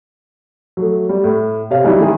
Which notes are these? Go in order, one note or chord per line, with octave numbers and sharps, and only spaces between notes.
F#3 A3
G3
A2
C3 C#5 F5
E3 F#3 G3 D#4 E4
D#3 G#3 G#4